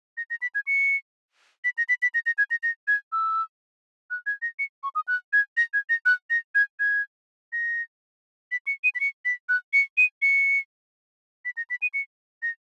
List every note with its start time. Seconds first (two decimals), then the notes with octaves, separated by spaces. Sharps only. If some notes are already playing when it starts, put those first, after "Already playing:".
0.17 A#6
0.30 A#6
0.42 B6
0.55 G#6
0.67 C#7
1.64 B6
1.78 A#6
1.89 B6
2.02 B6
2.14 A#6
2.26 A#6
2.38 G#6
2.51 A#6
2.63 A#6
2.88 G#6
3.12 E6
4.11 F#6
4.26 G#6
4.42 A#6
4.59 C#7
4.83 C#6
4.95 D#6
5.08 F#6
5.33 G#6
5.57 A#6
5.74 G#6
5.89 A#6
6.06 F#6
6.30 A#6
6.55 G#6
6.80 G#6
7.53 A#6
8.52 B6
8.67 C#7
8.84 D#7
8.95 B6
9.00 C#7
9.25 B6
9.49 F#6
9.73 C#7
9.97 D#7
10.22 C#7
11.45 B6
11.57 A#6
11.70 B6
11.82 D#7
11.94 C#7
12.43 A#6